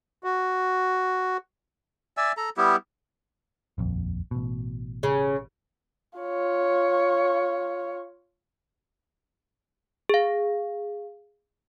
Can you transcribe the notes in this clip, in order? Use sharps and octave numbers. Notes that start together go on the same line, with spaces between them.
F#4
D5 E5 G#5 E6
A4 A#5
G3 B3 E4 G4
D#1 A#1 F2
A1 B2
C#3
F4 C#5
G#4 F5